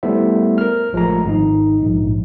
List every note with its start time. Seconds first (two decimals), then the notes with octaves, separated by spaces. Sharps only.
0.03 G3 A3 B3 E4 C5 E5
0.58 A#4 F6
0.93 A1 F3 G#3 A3 A#5
1.25 G#1 D#4
1.82 A#1 G#2